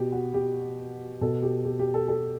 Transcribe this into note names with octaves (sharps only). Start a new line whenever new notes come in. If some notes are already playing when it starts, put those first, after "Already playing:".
Already playing: B2 G4
F#4
G4
B2 A4
G4
G4
G4
A4
A4